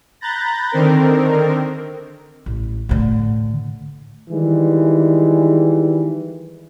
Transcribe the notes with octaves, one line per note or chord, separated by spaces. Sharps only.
A#5 B5 F#6 G6 A6 A#6
D3 D#3 C4 A#4
A1
A2 D3
D#3 E3 G3 G#3